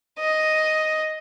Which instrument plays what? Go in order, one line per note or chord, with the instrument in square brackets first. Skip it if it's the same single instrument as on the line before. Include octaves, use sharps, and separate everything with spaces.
[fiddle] D#5